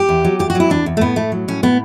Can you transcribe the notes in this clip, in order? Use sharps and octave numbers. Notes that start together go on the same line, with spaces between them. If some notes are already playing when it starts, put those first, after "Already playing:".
Already playing: G4
E2
F#3
E2 G4
F#4
F#3
E4
E2 D4
E2
A3
A2 B3
A2 A3
F#3
A2 C#4
A2 B3